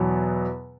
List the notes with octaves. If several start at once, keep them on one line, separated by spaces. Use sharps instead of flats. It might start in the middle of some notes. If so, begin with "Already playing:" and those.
Already playing: E2 B2 F#3 B3